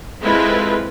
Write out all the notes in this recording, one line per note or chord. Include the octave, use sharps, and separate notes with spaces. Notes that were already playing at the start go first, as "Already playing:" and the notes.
G#3 C4 E4 F4 A4 B4